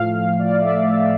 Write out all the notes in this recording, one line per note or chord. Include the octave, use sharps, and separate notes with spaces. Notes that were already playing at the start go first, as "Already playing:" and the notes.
Already playing: A2 F3 A3 F5
F5
D5
E5
D5